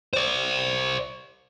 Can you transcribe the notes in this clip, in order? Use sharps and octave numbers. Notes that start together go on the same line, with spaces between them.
C5 D5